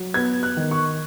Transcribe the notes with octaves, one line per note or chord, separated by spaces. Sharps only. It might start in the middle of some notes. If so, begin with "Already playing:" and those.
Already playing: F#3
B3 G#6
F#6
D#3
C#6